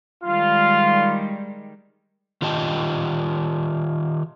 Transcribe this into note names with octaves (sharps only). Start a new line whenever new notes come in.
D#3 G3 G#3 F4
D#3 F4 G4 D#5 G5 A5